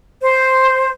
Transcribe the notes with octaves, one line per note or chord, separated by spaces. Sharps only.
C5